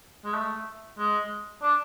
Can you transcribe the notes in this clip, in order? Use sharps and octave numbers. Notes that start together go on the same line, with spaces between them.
G#3
A3
G#3
D4